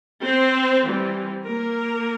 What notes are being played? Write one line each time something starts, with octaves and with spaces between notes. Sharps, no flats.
C4 C5
E3 G3 C4
A#3 A#4